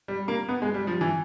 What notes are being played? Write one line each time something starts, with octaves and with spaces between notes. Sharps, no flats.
G3
A#3
B3
G#3
G3
F3
E3